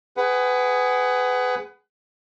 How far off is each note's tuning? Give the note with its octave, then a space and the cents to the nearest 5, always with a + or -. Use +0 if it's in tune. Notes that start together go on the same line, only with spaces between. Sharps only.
G#4 +0 B4 +25 F#5 +25